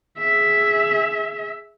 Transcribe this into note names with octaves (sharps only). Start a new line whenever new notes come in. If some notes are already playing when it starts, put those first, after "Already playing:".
G#4 E5